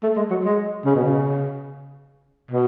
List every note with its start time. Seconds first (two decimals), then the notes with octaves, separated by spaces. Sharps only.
0.03 A3
0.16 G#3
0.30 F#3
0.44 G#3
0.85 C#3
0.95 B2
1.05 C#3
2.51 B2